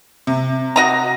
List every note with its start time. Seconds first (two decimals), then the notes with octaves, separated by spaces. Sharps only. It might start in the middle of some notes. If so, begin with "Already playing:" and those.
0.27 C3
0.76 F#4 D#5 A#5